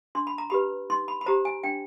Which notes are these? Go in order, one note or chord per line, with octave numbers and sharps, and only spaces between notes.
D4 C6
B5
A#5
G4 B4 B5
D#4 C6
B5
B5
G4 C5 A#5
G#5
D4 G5